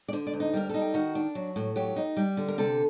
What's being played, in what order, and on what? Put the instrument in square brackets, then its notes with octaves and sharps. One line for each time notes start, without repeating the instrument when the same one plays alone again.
[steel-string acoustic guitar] D5
D3 C5
D5
D2
D#4
G3 A#4
D#4 A4
G4
D#3 F#4
D4
F#3
A2
F#3 G4
D#4
G3
D3
A#4
C3 A4